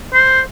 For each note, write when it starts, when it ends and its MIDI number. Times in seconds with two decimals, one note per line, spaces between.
0.13 0.40 72